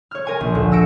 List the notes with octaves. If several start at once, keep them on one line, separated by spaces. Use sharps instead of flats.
C#5 F6
A#4 G#5 C#6
A#1
D2
E6 A#6 C#7 D7